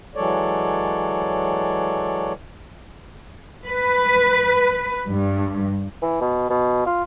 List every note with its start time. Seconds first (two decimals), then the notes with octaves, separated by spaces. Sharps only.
0.16 E3 F#3 G#3 A4 C#5 D5
3.66 B4
5.09 G2
6.02 E3
6.21 B2
6.50 B2
6.86 F4